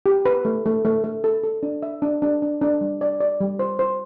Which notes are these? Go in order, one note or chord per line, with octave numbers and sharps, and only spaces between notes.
G4
B4
A3
A3
A3
A3
A4
A4
D4
E5
D4
D4
D4
D4
G3
D5
D5
G3
C5
C5